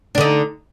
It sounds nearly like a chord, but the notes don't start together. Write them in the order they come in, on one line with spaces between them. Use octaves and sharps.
D4 D3 D#4